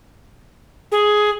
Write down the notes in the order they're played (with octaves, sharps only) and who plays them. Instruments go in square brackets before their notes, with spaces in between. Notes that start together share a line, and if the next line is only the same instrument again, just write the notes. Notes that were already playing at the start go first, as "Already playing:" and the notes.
[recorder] G#4